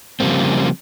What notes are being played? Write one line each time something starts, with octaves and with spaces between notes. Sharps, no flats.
C#3 F3 G3 A#3 C4